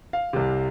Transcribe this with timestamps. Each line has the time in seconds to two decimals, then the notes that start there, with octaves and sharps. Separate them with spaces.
0.13 F5
0.33 C2 C3